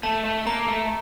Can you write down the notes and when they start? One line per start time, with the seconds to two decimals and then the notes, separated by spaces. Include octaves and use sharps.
0.03 A3 A5
0.25 A3
0.46 A#3 A#5
0.68 A3